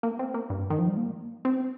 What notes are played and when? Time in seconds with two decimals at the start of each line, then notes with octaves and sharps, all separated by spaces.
0.03 A#3
0.19 C4
0.34 A#3
0.50 G2
0.70 D#3
0.79 F3
0.88 G3
0.97 A#3
1.45 C4